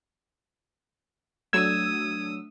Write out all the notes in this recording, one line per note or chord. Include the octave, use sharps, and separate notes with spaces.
F#3 A3 D4 D#6 E6 G#6